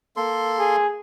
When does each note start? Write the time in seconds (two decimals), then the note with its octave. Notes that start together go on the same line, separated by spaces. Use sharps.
0.16 A#3 A4 C6
0.59 G#4